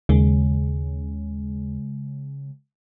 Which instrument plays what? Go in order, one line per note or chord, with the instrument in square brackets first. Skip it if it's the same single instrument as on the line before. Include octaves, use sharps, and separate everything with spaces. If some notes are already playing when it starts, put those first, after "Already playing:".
[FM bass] D#2 [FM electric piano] C#3 G#3